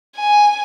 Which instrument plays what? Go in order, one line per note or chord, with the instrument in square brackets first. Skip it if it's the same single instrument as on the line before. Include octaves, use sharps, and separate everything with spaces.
[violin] G#5